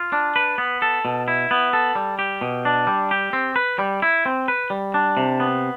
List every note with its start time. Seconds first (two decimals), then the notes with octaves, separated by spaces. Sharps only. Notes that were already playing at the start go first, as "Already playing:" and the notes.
Already playing: F4
0.12 D4
0.36 B4
0.58 B3
0.82 A4
1.05 B2
1.28 E4
1.51 B3
1.73 A4
1.95 G3
2.19 G4
2.41 B2
2.65 D4
2.87 G3
3.11 G4
3.33 C4
3.56 B4
3.79 G3
4.02 E4
4.26 C4
4.48 B4
4.70 G3
4.94 D4
5.17 C3
5.40 B3